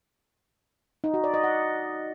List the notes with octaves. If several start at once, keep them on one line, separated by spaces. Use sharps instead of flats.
D#4
F#4
D5
D#5
F#5